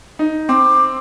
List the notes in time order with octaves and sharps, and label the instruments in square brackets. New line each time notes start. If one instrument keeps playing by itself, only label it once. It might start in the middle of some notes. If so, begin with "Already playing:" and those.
[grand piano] D#4
[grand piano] C4 [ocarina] D6